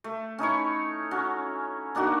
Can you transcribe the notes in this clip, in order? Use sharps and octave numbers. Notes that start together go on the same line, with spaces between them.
A3
C#4 D#4 E4 C#5
C#4 F#4
A#3 D4 D#4 F#4